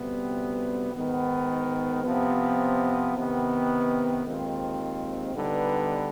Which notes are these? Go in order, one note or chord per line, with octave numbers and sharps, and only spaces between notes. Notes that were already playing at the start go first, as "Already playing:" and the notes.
Already playing: D2 C3 G3 B3
G#2 D#3 B3
C3 F3 B3
C3 D#3 B3
D#2 D#3 G#3 C4 F4
D3 G3 B3 D#4 B4